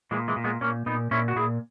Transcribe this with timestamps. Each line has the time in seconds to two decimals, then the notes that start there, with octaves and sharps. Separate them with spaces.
0.11 A#2 E3 G#3
0.28 E3 G#3
0.36 A#2
0.44 G#3 B3
0.61 A#2 A#3 C#4
0.86 A#2 B3 D#4
1.11 A#2 C#4 E4
1.28 F#4
1.36 A#2 E4 G#4